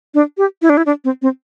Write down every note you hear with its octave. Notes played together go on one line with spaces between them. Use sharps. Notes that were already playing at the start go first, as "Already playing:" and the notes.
D4
G4
E4
D4
E4
D4
C4
C4